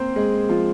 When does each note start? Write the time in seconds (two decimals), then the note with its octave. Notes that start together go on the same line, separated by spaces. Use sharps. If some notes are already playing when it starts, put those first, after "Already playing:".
Already playing: A#3 C4 A#4 C5
0.16 G#3 G#4
0.49 F3 F4